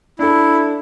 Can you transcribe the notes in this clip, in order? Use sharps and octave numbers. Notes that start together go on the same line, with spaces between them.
D4 E4 A4